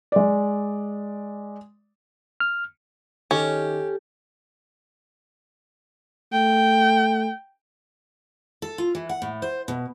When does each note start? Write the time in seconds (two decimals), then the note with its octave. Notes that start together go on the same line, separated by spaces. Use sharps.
0.12 G#3 D5
2.40 F6
3.31 D#3 C#4 G4 A4
6.33 A3 G5
8.62 A4
8.78 F4
8.95 E3
9.09 F#5
9.22 A2
9.42 C5
9.68 B2